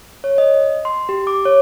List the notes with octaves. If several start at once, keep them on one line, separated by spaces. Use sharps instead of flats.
C#5
D#5
C6
G4
D6
C#5